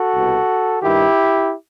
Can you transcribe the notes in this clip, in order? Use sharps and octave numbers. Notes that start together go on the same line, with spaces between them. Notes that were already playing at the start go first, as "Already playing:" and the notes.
Already playing: F#4 A4
C2 B2
G2 D#3 E4 G4